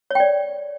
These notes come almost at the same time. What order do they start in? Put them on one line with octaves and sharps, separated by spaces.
C#5 G5 D5